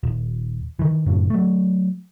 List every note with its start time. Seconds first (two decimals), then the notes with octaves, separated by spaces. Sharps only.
0.03 D#1
0.79 D#3 E3
1.07 F#2 A2 C#3
1.30 F#3 A3